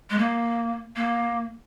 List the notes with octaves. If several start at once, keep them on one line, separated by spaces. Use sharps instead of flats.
G#3
A#3
A#3